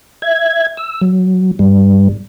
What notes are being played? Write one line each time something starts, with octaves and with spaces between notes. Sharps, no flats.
E5 G#6
E6
F#3
G2 G3